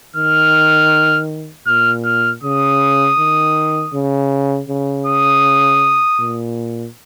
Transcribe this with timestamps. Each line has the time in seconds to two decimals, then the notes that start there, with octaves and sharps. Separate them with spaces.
0.16 D#3 F6
1.67 A#2 F6
2.05 F6
2.43 C#3 D#6
3.18 D#3
3.93 C#3
4.69 C#3
5.06 D#6
6.19 A#2